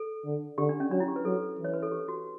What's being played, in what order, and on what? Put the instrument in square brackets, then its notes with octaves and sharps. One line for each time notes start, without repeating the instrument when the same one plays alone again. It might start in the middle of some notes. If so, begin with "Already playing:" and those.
Already playing: [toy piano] A4
[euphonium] D3
[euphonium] D3 [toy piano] G4
[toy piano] D4
C#4
[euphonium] F#3 [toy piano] D4
[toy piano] E4
G4
B4
[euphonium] F#3 [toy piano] A4
[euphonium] E3
[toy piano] C#5
B4
A4
G4
F#4